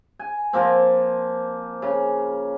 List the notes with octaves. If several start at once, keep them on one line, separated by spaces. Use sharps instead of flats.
G#5
F3 A#3 C4
C#3